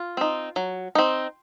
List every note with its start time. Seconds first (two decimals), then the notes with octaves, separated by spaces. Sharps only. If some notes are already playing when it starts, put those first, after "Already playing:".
Already playing: F4
0.17 C4 D#4
0.56 F#3
0.95 C4 D#4